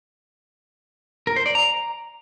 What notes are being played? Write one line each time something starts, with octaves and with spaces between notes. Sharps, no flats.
A#4
C5
D5
A#5